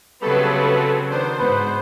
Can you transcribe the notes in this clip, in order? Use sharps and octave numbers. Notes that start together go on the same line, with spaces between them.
C#3 F#3 G3 A3 B3 C4 A4 B4
D#3 B3 D4 C5
G#2 B3